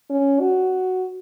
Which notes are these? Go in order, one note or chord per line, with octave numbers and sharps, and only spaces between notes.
C#4
F#4